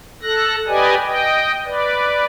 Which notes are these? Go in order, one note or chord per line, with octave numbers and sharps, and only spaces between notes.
A4 F#6 A#6
G4 B4 D5 D#5 G#5
D#5 G5
B4 D5